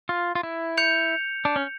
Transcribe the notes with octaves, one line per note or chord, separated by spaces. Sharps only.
F4
F4
E4
G6 C#7 F7
D4
C#4